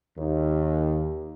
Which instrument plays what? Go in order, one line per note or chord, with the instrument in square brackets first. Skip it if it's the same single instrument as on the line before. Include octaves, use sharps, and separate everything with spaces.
[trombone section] D#2